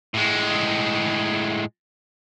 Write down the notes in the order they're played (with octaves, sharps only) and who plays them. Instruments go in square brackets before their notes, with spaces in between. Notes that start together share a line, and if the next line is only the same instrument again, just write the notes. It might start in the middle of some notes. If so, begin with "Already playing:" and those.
[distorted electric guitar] A2 G#3